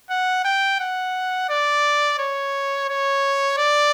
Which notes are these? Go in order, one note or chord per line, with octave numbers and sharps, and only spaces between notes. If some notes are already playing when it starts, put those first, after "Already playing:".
F#5
G5
F#5
D5
C#5
C#5
D5